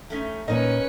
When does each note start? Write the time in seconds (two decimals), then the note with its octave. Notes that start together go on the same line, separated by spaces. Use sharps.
0.10 A3 C#4 D#4
0.48 A#2 C#4 D#4 A#4 B4 D#5